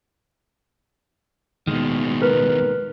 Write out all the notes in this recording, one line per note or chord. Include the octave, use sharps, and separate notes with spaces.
D#2 B2 D#3 G#3
A#4 B4